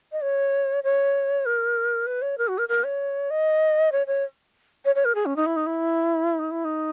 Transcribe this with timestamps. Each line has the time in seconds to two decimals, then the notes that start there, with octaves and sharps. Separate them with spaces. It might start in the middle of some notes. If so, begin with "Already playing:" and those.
0.12 D#5
0.22 C#5
0.84 C#5
1.46 A#4
2.07 B4
2.22 C#5
2.38 A#4
2.48 F#4
2.58 A#4
2.69 A#4
2.84 C#5
3.30 D#5
3.92 C#5
4.07 C#5
4.85 C#5
4.95 C#5
5.05 A#4
5.15 G#4
5.26 C#4
5.36 D#4
5.46 E4
5.56 D#4
5.67 E4
6.39 D#4
6.51 E4
6.65 D#4